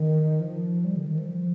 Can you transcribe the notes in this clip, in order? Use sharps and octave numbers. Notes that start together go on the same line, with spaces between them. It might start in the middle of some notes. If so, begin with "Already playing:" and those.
Already playing: D#3
F3
G3
D3
D#3
F3